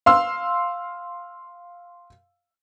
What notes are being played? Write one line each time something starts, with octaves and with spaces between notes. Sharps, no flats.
F5 C6 E6